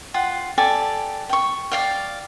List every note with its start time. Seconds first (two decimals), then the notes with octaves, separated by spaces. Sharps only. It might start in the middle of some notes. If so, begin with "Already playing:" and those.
0.14 F4 F#5 G5
0.58 G4 A4 D5 G#5
1.29 G5 C#6
1.72 D5 F5 G5